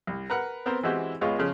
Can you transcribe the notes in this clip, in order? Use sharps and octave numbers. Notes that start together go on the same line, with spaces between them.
C2
A#4 B4 F#5
B3 C4 A#4 C5
E3 G#3 C4 E4 F#4 G4
C#2 G#3 B3 F4 C#5
C#3 F3 G#3